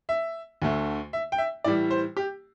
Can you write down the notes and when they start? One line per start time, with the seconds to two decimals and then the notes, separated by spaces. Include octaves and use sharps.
0.09 E5
0.62 D2 D3 A3
1.13 E5
1.32 G5
1.38 E5
1.64 A2 E3 G3 D5
1.91 C5
2.17 G4